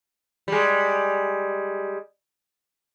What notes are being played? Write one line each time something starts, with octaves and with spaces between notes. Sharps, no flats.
G3 G#3